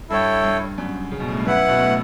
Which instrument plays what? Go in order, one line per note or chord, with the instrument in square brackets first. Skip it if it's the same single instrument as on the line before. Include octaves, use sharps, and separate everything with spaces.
[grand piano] G2 [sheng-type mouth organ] E4 A4 C#5 G5
[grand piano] G2
F#2
C#3
B2
A2
G2
[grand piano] F#2 [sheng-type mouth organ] E4 B4 F#5
[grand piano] B2
A2